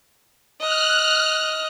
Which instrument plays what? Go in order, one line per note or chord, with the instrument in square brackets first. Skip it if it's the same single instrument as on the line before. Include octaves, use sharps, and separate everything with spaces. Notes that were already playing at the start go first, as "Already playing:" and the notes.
[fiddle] D#5 [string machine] F6 F#6